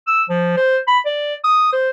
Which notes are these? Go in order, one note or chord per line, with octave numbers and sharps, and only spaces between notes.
E6
F3
C5
B5
D5
D#6
C5